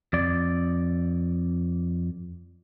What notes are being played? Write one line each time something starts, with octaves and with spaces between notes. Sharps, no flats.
F2 D5